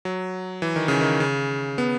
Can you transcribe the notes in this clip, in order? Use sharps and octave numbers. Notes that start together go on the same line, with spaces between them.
F#3
E3
D#3
C#3
D#3
C#3
B3